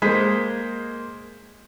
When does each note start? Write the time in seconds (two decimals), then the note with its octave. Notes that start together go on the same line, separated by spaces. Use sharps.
0.02 G#3 A#3 C5 B6